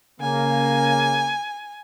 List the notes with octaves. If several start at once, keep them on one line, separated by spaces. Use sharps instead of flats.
C#3 A#3 G#5